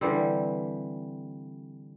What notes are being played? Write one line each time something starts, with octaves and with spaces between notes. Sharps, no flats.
D3 E3 G3 C4